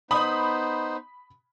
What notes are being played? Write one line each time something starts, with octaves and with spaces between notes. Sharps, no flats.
B3 D#4 C5 B5 D#6